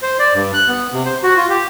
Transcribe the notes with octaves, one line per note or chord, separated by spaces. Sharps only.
C5
D5
G2
F#6
B3
C3
C5
F#4
F4
G4